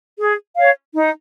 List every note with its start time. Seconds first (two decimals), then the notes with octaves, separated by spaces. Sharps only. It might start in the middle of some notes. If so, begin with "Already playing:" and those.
0.19 G#4
0.57 C#5 F5
0.96 D#4